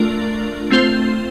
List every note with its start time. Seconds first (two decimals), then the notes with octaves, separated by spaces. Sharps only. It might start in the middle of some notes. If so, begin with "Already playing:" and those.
Already playing: A3 D4 F4 A#4 D5
0.70 A3 C4 F4 C5